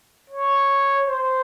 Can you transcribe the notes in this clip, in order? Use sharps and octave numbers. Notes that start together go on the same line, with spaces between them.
C#5
C5